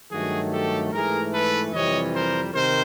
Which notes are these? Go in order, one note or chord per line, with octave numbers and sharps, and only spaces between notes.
G2 D#3 F#3 A3 F#4 G#4
G4 A4
G#2 E3 A3 G#4 A#4
A4 B4
F2 C3 E3 G3 C#5 D#5
A#4 C5
C3 D#3 A#4 C5